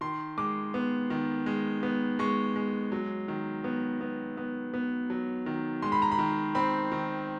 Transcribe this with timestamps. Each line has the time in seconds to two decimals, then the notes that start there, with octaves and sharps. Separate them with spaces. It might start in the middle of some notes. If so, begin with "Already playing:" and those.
0.01 D#3 C6
0.38 G#3 D6
0.74 B3
1.10 D#3
1.46 G#3
1.83 B3
2.19 G#3 C#6
2.56 G#3
2.92 F#3
3.28 D#3
3.64 B3
4.01 B3
4.37 B3
4.74 B3
5.10 F#3
5.46 D#3
5.82 G#3 C6
5.92 B5
6.02 A#5
6.12 B5
6.19 D#3
6.55 C4 B5
6.92 D#3